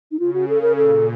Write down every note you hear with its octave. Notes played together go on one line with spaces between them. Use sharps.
D#4
C#3 F4
F#4
C#3 A4
A#4
A#2 A4